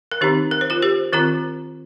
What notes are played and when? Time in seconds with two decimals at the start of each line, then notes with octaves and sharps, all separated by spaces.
0.12 A#4
0.21 D#3 C4 D#4 G4
0.51 A#4
0.61 C5
0.70 F4 A#4
0.82 G4 C5
1.13 D#3 C4 F4 A#4